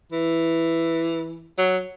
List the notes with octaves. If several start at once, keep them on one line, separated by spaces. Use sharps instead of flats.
E3
F#3